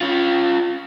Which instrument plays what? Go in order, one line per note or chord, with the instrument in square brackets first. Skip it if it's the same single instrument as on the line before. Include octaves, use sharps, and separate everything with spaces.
[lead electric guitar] C#4 F4